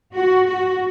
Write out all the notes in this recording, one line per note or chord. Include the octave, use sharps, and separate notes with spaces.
F#4
F#4